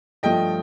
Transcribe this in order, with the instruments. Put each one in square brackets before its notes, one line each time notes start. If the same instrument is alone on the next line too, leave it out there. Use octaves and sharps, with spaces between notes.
[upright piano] G2 F3 A3 D#5 G5